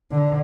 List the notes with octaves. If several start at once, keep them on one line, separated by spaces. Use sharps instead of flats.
D3